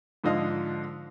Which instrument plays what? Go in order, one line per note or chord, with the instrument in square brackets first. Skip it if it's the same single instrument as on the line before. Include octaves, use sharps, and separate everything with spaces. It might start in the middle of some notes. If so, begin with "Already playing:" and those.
[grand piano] G#2 D3 F3 D#5 F5 D#6